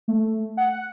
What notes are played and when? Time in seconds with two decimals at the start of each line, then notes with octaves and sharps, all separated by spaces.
0.08 A3
0.57 F#5